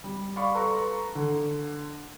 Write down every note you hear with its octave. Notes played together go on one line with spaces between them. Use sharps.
G3
D5 F5 B5 C#6
A4 B4 A#5 C6 C#6
D3